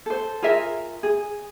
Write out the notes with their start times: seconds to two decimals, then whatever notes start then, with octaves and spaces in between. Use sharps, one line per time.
0.06 A4 C5
0.42 F4 G#4 A#4 E5
1.03 G#4